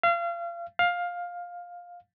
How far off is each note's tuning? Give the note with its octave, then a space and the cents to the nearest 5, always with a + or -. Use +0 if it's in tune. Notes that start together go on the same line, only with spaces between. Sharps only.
F5 -30
F5 +15